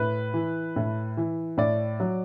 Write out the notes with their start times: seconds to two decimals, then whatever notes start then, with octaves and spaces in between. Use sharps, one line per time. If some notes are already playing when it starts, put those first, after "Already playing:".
Already playing: A2 B4
0.34 E3
0.76 A2
1.17 E3
1.58 A2 D5
2.00 F#3